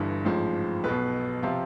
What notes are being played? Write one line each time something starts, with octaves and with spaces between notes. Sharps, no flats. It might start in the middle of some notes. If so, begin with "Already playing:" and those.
Already playing: G1 G2 E3
A1 G#2 F3
B1 B2 B4
C3 F3 F4